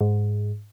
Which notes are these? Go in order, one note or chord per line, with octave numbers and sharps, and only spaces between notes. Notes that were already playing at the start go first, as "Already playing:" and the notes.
G#2